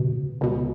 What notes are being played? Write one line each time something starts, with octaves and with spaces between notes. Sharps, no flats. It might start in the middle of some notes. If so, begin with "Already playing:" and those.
Already playing: C#2 B2
C#2 B2